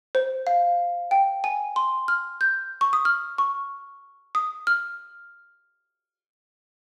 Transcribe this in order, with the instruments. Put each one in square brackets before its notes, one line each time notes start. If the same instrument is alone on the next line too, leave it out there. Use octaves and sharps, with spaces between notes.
[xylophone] C5
F5
G5
G#5
C6
F6
G6
C#6
D#6
F6
C#6
D#6
F6